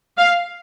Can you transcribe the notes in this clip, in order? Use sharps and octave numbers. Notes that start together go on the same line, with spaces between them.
F5